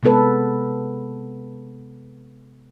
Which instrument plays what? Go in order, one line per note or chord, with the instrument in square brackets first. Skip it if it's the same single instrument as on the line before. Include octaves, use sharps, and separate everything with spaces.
[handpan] C3 G#3 B3 A4 B4